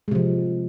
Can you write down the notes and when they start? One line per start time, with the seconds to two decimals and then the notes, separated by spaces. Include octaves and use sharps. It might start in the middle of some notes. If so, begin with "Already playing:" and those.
0.08 G#3
0.11 C3
0.15 F3